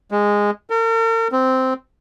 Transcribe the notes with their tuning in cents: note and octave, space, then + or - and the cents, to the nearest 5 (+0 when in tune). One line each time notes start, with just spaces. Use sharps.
G#3 -10
A#4 -45
C4 -10